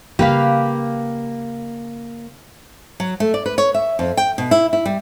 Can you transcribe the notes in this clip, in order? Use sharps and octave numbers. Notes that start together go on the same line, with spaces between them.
C#3 G3 A#3 G4 B4 F5
F#3
A3
D5
B4
C#5
E5
F2
G5
B2
E4
E4
G3